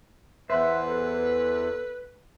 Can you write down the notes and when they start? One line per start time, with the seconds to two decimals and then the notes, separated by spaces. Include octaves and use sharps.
0.50 E2 B4 C5 E5 F#5
0.85 A4